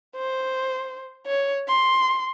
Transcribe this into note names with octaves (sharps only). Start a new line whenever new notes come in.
C5
C#5
C6